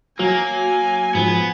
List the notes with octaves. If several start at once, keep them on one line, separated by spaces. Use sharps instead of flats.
F#3 A#3 G#5
G#2 F3 B3